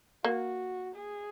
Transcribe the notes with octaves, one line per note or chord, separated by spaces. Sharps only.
A#3 F#4
G#4